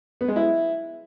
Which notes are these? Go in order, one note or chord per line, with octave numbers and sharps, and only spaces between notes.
B3
G#3
E4